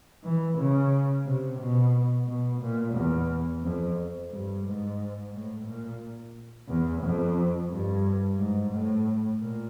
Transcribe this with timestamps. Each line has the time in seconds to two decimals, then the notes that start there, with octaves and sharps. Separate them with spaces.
0.24 E3
0.58 C#3
1.26 C3
1.60 B2
2.28 B2
2.62 A#2
2.95 E2
3.63 F2
4.31 G2
4.65 G#2
5.33 A2
5.66 A#2
6.69 E2
7.02 F2
7.70 G2
8.38 G#2
8.72 A2
9.40 A#2